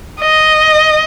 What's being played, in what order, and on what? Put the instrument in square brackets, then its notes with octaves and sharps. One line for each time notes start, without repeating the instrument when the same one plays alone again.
[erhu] D#5